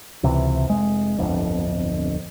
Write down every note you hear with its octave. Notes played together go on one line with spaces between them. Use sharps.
C#2 C3 E3
F1 G#3
D1 G1 F2